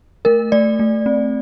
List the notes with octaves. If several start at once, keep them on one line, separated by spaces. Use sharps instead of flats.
A3 A#4
A3 D5
A3
C4